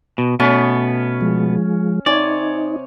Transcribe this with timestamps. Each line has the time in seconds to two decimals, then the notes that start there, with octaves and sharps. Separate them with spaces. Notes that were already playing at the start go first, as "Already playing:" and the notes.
0.18 B2
0.40 B2 A3 B3 C#4
1.21 F3 G#3
2.06 C3 D#4 C#5 D5 G#5